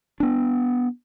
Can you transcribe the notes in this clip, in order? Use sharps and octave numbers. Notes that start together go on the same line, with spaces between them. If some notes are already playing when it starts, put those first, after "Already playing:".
B3 D4